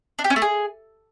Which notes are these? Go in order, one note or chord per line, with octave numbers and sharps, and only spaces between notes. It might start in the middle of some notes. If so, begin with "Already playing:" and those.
D4
G4
C#4
A3
G#4